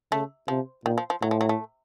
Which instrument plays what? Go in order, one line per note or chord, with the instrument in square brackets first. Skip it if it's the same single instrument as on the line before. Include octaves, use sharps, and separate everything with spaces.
[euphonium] C#3 [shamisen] A3
[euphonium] C3 [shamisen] F3
[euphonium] A#2 [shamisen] D#3
[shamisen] F3
F3
[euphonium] A2 [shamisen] F#3
[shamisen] F3
F#3
A3